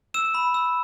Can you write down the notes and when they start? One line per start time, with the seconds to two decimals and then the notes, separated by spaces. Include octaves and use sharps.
0.14 E6 E7
0.35 B5
0.54 E6